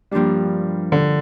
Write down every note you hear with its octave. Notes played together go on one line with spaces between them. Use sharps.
G2 F3 G3 A#3 D4
D3